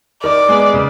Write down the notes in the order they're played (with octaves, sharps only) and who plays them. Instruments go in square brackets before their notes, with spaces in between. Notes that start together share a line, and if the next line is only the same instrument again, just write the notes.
[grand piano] D#3 [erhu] D5
[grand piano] G#3 B3
C#3